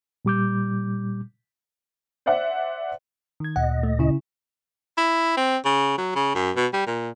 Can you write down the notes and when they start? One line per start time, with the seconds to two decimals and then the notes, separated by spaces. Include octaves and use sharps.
0.25 A#2 G3 D6 G6
2.26 C5 D5 E5 F#5
3.40 D#3 G#6
3.56 D2 A#2 D#5 F#5
3.83 A3
3.99 C#3 E4
4.97 E4
5.37 C4
5.65 C#3
5.98 F#3
6.15 C#3
6.35 F#2
6.56 B2
6.73 G3
6.87 A#2